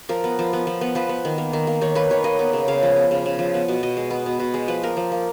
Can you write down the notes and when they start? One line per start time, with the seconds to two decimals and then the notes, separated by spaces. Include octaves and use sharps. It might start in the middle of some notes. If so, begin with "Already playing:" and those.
0.09 F3 A#4
0.24 B3
0.39 F3
0.53 B3
0.67 F3
0.81 B3
0.95 F3 B4
1.09 B3
1.25 D#3
1.38 A#3
1.53 D#3
1.67 A#3
1.81 D#3 C#5
1.95 A#3 B4
2.10 D#3 C#5
2.24 A#3 D#5
2.39 B3
2.53 C#3
2.68 C#3 F5
2.83 F3
2.96 B3
3.11 C#3
3.26 C#3
3.39 F3
3.54 B3
3.68 B2
3.83 B2 D#5
3.97 G#3
4.11 B3
4.26 B2
4.40 B2
4.54 G#3
4.68 F3 B4
4.83 A#3 A#4
4.97 F3
5.12 A#3